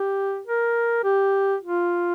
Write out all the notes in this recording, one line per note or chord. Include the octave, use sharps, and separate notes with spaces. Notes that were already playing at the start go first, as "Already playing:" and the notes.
Already playing: G4
A#4
G4
F4